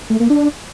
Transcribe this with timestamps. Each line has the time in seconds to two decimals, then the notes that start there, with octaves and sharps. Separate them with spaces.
0.10 A3
0.20 A#3
0.30 D4